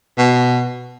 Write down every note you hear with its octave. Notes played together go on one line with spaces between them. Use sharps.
B2